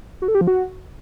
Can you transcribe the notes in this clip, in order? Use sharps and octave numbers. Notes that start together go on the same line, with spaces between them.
F#4
A4
G4
F3
F#4